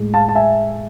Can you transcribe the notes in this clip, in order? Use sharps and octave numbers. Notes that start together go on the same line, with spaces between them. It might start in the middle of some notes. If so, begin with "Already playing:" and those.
Already playing: A2 G#3
F5 A5
A5
E5 G#5